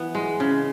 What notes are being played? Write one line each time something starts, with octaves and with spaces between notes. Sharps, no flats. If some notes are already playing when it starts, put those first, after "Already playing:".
Already playing: E3 B3
G#3
C#3